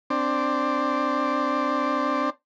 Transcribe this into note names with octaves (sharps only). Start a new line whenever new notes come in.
C4 D4